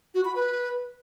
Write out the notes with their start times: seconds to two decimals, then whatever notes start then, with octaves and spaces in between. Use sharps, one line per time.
0.15 F#4
0.25 B5
0.36 B4